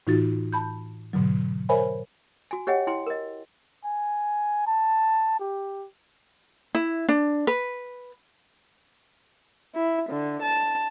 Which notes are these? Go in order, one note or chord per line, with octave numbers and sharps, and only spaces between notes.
A2 E3 D#4 F4 F#4 A6
A5 B5 G6
G#2 B2 D3 F#3
A#4 C5 C#5 E5 G#5 B5
F#4 G#5
G4 C#5 D#5 F#5 G5
E4 G5 C6
A#4 D#5
G#5
A5
G4
E4
D4
B4
E4
D3
A5